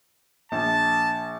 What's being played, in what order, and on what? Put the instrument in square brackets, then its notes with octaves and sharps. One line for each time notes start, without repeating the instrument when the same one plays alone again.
[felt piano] A#1 [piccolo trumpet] A5